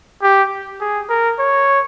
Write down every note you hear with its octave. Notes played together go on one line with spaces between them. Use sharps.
G4
G#4
A#4
C#5